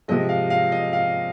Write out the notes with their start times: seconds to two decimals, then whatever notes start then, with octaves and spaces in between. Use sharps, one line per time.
0.08 C3 F3 G#3 D#5
0.29 F5
0.50 F5
0.72 D#5
0.93 F5